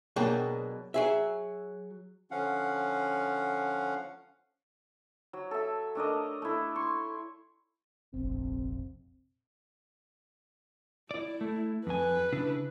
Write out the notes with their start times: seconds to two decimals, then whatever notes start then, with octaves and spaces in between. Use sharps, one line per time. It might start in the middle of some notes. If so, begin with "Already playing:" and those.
0.16 B2 F#3 A#3 D4 G#4 G5
0.94 F#3 G#4 E5
2.31 D3 F3 C#4 F5 F#5
5.33 F#3
5.51 A4 E5
5.95 A3 D4 A#4 D#5
6.42 A3 E4
6.76 C6 C#6
8.14 F1 A#1 C4
11.11 E4 D5
11.41 A3
11.87 F2 B4 G#5
12.33 C#3 D4 E4